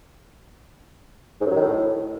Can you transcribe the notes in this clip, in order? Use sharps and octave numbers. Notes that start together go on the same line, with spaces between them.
G#2
F#2
F#3
D#3
A2